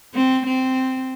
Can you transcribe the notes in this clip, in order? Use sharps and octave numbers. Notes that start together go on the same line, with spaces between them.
C4
C4